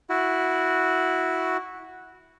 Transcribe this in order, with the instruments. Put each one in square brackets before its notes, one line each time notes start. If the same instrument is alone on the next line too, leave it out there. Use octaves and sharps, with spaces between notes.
[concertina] E4 F#4